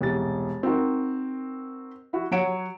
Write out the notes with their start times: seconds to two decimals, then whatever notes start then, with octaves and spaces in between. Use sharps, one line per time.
0.01 E1 C2 A6
0.63 C4 D#4 F#4 A#4
2.13 E4 F#4
2.31 F#3 C#5 F#5 D7 E7